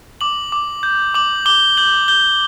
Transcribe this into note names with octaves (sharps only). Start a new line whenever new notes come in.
D6 F#7
D6
G6
D6 F#7
D6 G7
G6 F#7
G6 G7